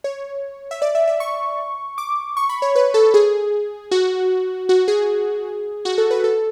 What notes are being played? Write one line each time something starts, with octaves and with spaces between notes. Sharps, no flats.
C#5
E5
D5
E5
E5
C#6
D6
C#6
B5
C#5
B4
A4
G#4
F#4
F#4
G#4
F#4
A4
B4
A4